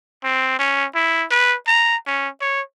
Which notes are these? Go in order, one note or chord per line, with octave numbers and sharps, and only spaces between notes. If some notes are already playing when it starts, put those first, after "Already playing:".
C4
C#4
E4
B4
A#5
C#4
C#5